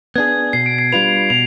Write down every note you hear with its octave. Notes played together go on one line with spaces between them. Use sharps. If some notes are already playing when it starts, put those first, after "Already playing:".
B3 D4 G#4 G#6
B2 C7
D7
C7
G3 D4 F4 B4 F7
B2 F7